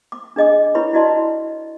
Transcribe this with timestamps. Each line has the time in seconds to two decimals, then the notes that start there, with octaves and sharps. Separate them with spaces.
0.12 D6
0.36 D4 G#4 D#5 G#5 D6
0.75 E4 B4 C#5 B5 C#6
0.93 E4 F#4 D5 D#5 A5 C6